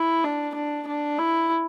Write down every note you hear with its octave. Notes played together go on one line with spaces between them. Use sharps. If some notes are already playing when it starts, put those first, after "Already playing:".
Already playing: E4
D4
D4
D4
E4